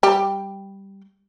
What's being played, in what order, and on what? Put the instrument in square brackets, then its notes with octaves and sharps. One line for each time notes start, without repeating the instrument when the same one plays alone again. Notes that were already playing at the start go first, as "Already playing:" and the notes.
[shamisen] G3 G4